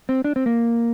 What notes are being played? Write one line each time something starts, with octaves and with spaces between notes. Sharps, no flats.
C4
D4
C4
A#3